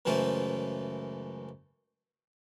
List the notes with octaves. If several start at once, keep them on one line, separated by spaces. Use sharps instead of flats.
C#2 F#2 E3 A3 F4 C5